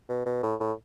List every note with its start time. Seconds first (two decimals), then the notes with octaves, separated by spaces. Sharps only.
0.09 B2
0.26 B2
0.43 A2
0.60 A2